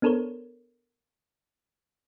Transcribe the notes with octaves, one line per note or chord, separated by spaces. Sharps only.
B3 D4 A4 A#4 C5 C#5